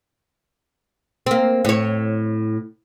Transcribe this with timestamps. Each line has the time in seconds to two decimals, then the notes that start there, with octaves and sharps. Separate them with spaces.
1.26 A#3 C4
1.65 A2 C#5